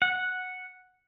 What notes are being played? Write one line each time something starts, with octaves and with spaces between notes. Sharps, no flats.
F#5